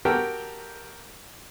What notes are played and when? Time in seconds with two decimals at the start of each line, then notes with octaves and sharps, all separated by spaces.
0.05 F#4 G4 A4 A#4 G5